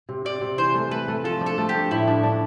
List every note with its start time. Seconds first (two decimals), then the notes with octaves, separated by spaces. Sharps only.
0.09 C3
0.25 C3 D5
0.41 C3
0.58 E3 C5
0.75 A3
0.91 A3 B4
1.08 A3
1.24 F3 A4
1.41 D4
1.46 A4
1.58 A3
1.69 G4
1.75 D4
1.91 A2 E4
2.08 D4
2.23 D4